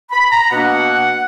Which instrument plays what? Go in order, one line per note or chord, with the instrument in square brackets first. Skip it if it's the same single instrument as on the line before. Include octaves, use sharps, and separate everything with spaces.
[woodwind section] B5
A#5
B2 A#3 D4 F#5